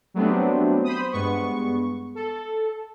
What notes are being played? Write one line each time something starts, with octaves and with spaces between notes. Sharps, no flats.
F#3 G3 A3 B3 C4 D4
C5 B5 D#6
G2 G#3 B3 C#6
A4